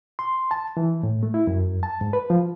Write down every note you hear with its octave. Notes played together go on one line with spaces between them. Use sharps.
C6
A5
E3
A2
A3
E4
F#2
A5
G#2
B4
F3